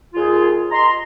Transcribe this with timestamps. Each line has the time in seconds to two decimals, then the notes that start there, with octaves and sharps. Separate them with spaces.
0.14 D#2 F4 G#4
0.72 D#5 A#5 C6